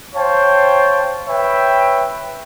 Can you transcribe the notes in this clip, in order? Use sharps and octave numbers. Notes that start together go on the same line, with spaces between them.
C5 C#5 F5 G5 A5
B4 C#5 E5 G5 B5